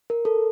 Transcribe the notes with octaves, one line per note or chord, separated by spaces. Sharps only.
A#4
A4